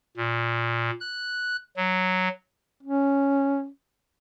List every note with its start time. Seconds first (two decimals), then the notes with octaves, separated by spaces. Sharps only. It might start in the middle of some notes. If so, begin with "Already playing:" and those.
0.17 A#2
1.00 F#6
1.77 F#3
2.83 C#4